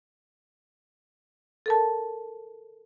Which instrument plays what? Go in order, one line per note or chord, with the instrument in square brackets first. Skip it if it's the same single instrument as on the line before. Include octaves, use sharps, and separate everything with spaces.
[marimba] A4 A#4 A5